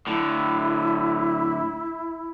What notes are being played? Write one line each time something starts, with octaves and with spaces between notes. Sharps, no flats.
A2 D3 E4